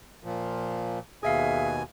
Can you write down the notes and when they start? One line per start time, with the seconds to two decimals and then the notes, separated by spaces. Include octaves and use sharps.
0.24 A#2 F3
1.23 D#2 B2 G#4 E5 F5 G#5